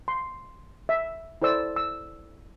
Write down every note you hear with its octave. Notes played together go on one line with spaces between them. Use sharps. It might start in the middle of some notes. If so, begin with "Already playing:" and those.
C6
E5
E4 A4 C5 D5 E6
E6